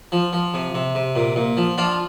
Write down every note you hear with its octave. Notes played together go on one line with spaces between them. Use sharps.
F3
F3
C3
C3
C3
A#2
A#2
F3
F3 D4 F4